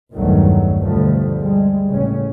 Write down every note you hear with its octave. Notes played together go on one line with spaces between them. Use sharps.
B1 E2 G2 D#3 F#3 A3
D2 B2 D3 F3 G3 A3
G3 G#3
A1 C#3 C#4